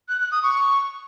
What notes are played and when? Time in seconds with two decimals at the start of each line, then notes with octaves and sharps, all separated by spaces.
0.09 F#6
0.20 F#6
0.32 D#6
0.43 C#6